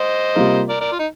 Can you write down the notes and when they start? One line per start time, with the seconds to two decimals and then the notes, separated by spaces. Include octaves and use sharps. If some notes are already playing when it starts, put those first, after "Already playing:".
Already playing: C5 D#5
0.35 C3 G3 A#3 F4 A#4
0.69 A#4 D5
0.80 A#4 D5
0.92 F4
0.99 D#4